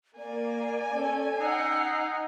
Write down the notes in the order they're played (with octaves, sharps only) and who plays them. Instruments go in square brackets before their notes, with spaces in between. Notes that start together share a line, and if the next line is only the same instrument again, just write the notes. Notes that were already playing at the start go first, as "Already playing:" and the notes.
[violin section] A#3 [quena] D5 [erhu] G#5
[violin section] C#4 [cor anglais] A4
[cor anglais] D#4 [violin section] F#5 C7 [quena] E6